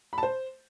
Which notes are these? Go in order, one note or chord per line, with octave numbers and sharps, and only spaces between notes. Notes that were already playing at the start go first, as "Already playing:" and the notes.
B5
A5
C5